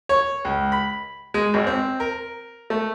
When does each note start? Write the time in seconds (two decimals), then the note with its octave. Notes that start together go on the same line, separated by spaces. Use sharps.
0.09 C#5
0.45 C#2
0.72 B5
1.34 G#3
1.54 G#1
1.67 C4
2.00 A#4
2.70 A3